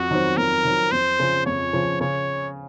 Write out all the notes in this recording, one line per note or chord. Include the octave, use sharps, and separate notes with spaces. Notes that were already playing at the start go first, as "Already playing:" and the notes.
Already playing: F2 F#4
D#3 F#3 C4
F2 A#4
D#3 F#3 C4
F2 C5
C#3 F3
F2 C#5
C#3 F3
C#3 C#5